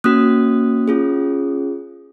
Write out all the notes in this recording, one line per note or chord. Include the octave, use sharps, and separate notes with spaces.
A#3 C#4 F#4 D#6 F#6
C#4 F4 G#4